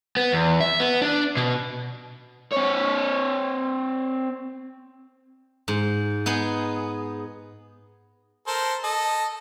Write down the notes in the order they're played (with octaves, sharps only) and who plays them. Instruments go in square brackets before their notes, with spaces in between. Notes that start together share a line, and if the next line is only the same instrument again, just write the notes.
[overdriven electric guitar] B3
E2
E5
B3
D4
B2
C4 C#5
[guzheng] G#2
B3 D#4 G#4
[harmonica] A4 A#4 C5
A4 D#5